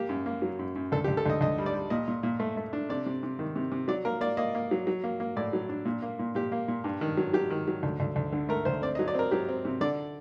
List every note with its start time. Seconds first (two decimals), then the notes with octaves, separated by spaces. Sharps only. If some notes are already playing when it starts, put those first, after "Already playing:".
Already playing: A#3 G4
0.09 F#2
0.26 A#3
0.42 F#3
0.59 F#2
0.76 F#2
0.92 D2 A4
1.04 G4
1.08 D2
1.17 A4
1.26 D2 D#5
1.41 D2 D#5
1.58 G3
1.66 D5
1.74 G3
1.90 A#2 D#5
2.08 A#2
2.23 A#2
2.40 A3
2.57 A3
2.73 D4
2.89 C3 D5
3.06 C3
3.23 C3
3.39 D#3
3.56 C3
3.72 C3
3.88 F#3 D5
4.05 A#3 A#4
4.21 A#3 D5
4.37 A#3 D#5
4.55 A#3
4.71 F#3
4.87 F#3
5.04 A#3
5.20 A#3
5.37 A2 D5
5.53 F#3
5.69 D4
5.85 A#2
6.02 A#3
6.19 A#2
6.35 A#2 G4
6.52 A#3
6.68 A#2
6.84 G2
7.01 D#3
7.17 F#3
7.34 F#3 G4
7.50 D#3
7.68 F#3
7.83 D2
8.00 D2
8.16 D2
8.32 D3
8.49 A3 A#4
8.65 D2 C5
8.82 C4 D5
8.95 D#5
8.99 F#3
9.08 D5
9.15 C4 A#4
9.31 F#3 G4
9.49 C4
9.65 C3
9.81 D3 D5